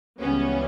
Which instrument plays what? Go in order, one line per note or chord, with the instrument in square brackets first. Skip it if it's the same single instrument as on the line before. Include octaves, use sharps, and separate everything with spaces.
[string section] C#2 C#3 E3 G3 B3 C#4